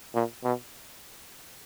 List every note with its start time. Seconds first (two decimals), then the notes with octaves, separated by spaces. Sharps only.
0.14 A#2
0.44 B2